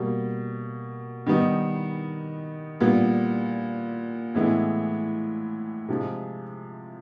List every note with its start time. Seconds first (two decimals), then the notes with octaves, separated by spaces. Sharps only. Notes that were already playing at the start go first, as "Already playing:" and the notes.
Already playing: B2 G3 A#3
1.26 D#3 G3 B3 D#4
2.80 A#2 G3 B3
4.34 A2 E3 G#3 B3 E4
5.88 C3 F3 G#3